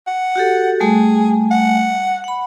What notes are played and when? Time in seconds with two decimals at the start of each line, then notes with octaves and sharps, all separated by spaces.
0.07 F#5
0.36 F#4 G4 A4
0.80 G3 A3 G#4 G#5
1.51 F#5
2.24 F#5 B5